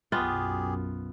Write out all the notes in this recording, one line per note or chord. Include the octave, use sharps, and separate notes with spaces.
B1 F#2 B3 F4 G4 G#4